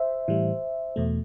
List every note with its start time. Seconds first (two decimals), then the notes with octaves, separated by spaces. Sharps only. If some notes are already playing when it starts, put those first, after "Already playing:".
Already playing: C5 E5
0.28 A2 E3 G3
0.96 E2 B2 A3